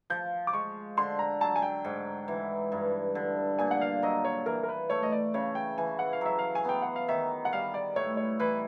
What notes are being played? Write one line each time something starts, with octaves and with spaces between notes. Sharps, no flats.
F3 G6
D6
G#3 C#6
D3 C6
A#5
F#3 A5
G#5
G5
G#2
E3
G2
D3
A#2 G#5
F#5
F5
F#3 D#5
C#5
E3 A#4
A#4
B4
A3 C#5
D#5
D5
C#3 C#5
G5
E3 G#5
F#5
F5
F#3 E5
F5
G#5
B3 G5
F#5
F5
D#3 E5
F#5
G3 F5
D5
A2 C#5
C#5
E3 B4